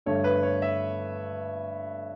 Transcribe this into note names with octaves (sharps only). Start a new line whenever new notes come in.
G2 D3 A3 C#5
B4
C#5
E5